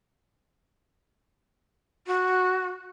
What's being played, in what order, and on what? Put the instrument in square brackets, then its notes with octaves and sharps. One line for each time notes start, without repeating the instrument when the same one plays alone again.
[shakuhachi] F#4